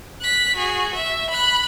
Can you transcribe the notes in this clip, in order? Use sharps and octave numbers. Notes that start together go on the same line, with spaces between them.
F#6 B6
F#4 G#4
E5
B5 F#6